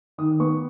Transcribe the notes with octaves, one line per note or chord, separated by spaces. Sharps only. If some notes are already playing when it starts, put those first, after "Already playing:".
D#3 D#6
B3 C#6